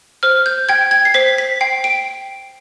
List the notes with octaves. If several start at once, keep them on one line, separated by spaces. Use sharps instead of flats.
C5 F6
G6
G5 G#6
G#6
C7
C5 B6
B6
G5 C7
D7